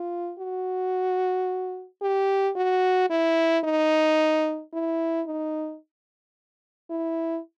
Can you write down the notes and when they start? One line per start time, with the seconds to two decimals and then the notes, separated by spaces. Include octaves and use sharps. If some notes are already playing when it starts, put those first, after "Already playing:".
Already playing: F4
0.39 F#4
2.02 G4
2.56 F#4
3.10 E4
3.64 D#4
4.73 E4
5.27 D#4
6.90 E4